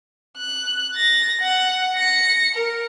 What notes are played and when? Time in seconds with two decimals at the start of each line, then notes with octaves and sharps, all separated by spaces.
0.37 F#6
0.95 A6 A#6
1.41 F#5
1.95 A#6 C#7
2.54 A#4